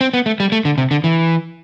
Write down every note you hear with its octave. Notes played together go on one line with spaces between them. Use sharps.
C4
B3
A3
G3
A3
D3
C3
D3
E3